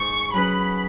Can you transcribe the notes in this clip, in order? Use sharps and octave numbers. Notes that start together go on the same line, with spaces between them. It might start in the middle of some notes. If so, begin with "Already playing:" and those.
Already playing: G#2 C#6
F#3 C#4 G#4 B4 B5